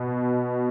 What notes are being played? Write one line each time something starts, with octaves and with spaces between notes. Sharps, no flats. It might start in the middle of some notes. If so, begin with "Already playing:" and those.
Already playing: B2